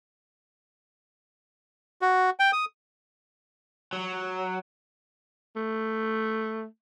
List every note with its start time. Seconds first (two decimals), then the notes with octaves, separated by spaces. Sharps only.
2.02 F#4
2.40 G5
2.53 D#6
3.93 F#3
5.56 A3